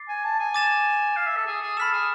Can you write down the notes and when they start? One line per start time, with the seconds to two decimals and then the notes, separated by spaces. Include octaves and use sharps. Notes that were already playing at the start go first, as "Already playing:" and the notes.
Already playing: D6 A6 C7
0.08 G#5
0.24 A5
0.39 G#5
0.54 D6 A6 E7
1.16 F5
1.26 E5
1.37 A4
1.47 G#4
1.62 G#4
1.77 A4 B5 F6 B6 E7
1.93 G#4